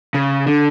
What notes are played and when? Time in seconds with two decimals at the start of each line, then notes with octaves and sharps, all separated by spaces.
0.14 C#3
0.46 D3